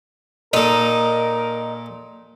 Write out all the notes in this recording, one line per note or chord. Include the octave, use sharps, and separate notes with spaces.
A#2 D#4 A4 A#4